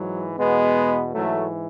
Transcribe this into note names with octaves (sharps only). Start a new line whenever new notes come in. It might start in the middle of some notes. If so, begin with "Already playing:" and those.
Already playing: G#2 E3 F#3
E2 B2 G#3 B3
G#2 E3 F#3 A3